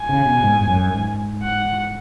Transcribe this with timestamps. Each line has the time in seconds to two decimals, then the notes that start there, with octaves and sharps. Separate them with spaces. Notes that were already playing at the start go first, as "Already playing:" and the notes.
Already playing: G#5
0.09 C#3
0.26 B2
0.43 G#2
0.61 G#2
0.68 F#2
0.93 G#2
1.43 F#5